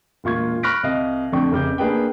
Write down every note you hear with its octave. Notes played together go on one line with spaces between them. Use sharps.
E1 A#2 F4 C#6 G#6
B5 C#6 F6 F#6 A#6 D7
C2 D#5 F5
F2 A3 D4 G5 C#6
F1 C#3 D6 G6
A#3 D4 G#4 B4 G5